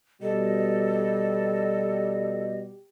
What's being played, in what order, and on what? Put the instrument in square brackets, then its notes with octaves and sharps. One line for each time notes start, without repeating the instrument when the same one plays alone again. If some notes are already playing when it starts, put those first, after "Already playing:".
[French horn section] B2 G3 [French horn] G4 [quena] A4 [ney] D#5